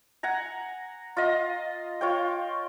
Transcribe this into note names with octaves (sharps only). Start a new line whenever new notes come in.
F#5 G#5 A#5
F4 D#5
F4 C#5 G5